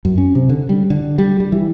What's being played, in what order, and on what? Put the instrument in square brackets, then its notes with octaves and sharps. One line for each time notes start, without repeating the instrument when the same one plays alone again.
[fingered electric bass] F#2
C#4
C3
D3
G3
D3
G3
G3
E3